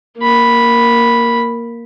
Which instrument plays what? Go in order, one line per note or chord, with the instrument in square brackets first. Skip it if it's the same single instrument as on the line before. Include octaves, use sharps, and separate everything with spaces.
[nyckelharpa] A#3 B5